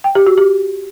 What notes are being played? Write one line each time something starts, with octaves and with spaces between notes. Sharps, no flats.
G5
G4
F#4
G4